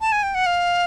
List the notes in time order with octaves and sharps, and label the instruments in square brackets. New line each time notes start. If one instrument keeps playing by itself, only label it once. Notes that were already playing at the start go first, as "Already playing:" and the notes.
[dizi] A5
G#5
G5
F#5
F5